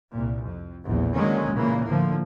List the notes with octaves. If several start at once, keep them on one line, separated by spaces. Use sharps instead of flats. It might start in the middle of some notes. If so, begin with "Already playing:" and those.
C2 A#2
F2
A#1 E2 A2
D3 D#3 F#3 G#3 A#3 C#4
A#2 C#3 E3 A#3
A2 D3 F3 A#3